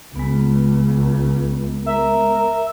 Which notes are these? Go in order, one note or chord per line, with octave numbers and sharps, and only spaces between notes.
C#2 G#3 B3
A#4 E5